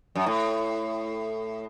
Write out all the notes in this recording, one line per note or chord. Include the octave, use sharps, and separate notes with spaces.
F#2
A2